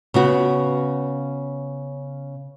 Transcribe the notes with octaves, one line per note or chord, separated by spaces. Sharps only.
C#3 B3 F#4